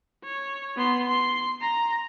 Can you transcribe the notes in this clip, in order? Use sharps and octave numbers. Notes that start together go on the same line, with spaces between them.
C#5
B3 C6
C6
A#5